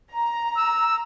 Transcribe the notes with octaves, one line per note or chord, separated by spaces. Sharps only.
A#5
E6